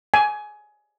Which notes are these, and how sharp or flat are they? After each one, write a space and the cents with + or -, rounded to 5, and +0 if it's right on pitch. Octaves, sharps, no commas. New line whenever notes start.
G#5 +15